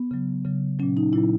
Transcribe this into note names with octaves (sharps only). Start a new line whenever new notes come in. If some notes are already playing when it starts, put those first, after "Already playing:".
Already playing: B3
C#3 F#3
C#3 F#3
A#2 F#3 C#4
D#4
A#2 F#3 E4